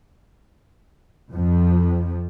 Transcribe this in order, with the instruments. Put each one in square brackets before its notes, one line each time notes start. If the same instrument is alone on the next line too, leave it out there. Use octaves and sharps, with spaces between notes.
[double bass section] F2 F3